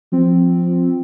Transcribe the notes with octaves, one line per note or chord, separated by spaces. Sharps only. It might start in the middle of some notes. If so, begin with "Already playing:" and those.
F3 C4